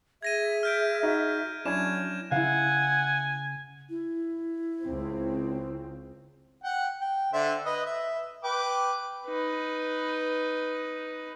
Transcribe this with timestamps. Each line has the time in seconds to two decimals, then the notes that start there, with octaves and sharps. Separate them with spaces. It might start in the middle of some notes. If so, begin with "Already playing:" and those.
0.23 G#4 E5 G#6 A#6 D#7
0.63 F6 G6 D7
1.03 D#4 F#4
1.66 F#3 C#4 D4 E4 G#6 E7
2.32 C#3 E4 F5 F#5 G#5
3.89 E4
4.83 C#2 C4
6.63 F#5 G5
7.01 G5
7.33 D3 C5 E5
7.66 B4 D#5
7.86 E5
8.44 B4 G5 D6
9.26 D#4 B4